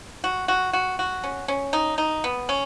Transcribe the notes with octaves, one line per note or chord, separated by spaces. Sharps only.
F#4
F#4
F#4
F#4
C#4
C#4
D#4
D#4
B3
C#4